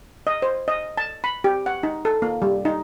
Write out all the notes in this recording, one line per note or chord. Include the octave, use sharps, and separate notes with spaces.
D#5
C5
D#5
A5
B5
G4
F#5
D#4
A4
A#3
G3
D#4